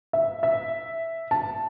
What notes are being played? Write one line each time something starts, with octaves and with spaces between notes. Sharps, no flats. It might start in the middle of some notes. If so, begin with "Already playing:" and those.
E5
E5
A5